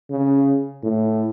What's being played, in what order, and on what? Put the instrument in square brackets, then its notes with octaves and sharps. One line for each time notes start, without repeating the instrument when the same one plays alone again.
[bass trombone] C#3
A2